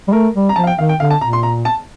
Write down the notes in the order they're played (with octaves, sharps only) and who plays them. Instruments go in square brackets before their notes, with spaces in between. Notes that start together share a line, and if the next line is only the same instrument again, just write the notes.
[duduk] G3
[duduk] A3 [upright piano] A#4
[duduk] G3
[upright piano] A#5
[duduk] F3 [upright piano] A5
[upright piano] F5
G5
[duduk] D#3 [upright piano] F5
[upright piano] G5
[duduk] D3 [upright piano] F5
[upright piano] A5
[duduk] A#2 [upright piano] A#5
[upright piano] C6
A#5
A5